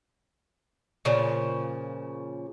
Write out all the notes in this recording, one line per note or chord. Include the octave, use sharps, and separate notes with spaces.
A#2 C#3 F3